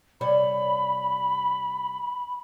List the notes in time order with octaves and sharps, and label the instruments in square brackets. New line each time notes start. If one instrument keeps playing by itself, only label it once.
[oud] C3 G3 C#5 [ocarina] B5